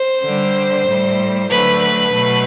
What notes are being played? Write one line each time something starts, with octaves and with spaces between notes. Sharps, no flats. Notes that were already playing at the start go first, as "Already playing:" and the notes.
Already playing: C5
D3 G3
A2 G3
D3 F#3 A3 B4
B4
B2 F#3 A3